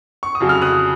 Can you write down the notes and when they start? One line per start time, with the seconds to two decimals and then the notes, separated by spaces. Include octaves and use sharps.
0.23 C#6
0.35 D#6
0.40 F2 C#3 F#3
0.49 F6
0.62 D#6 F#6